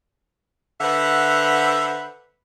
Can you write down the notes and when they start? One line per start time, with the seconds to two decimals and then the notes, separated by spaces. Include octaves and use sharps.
0.81 D3 B4 C5 E5 F#5